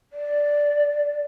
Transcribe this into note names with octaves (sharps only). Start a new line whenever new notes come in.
D5